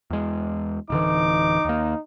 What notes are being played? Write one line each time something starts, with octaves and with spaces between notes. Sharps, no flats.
E2 G#3
D1 D3 E3 D#4 D6
D#2 A#3